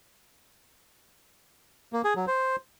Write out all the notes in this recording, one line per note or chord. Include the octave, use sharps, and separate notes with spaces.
A#3
G#4
F#3
C5